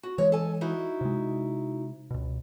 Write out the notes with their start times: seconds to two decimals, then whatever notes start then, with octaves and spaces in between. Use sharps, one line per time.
0.03 F#4
0.18 E3 G#3 C#5
0.32 A4 G#5
0.61 D#4 E4 F#4
1.01 C3 G#3
2.11 C#2 B2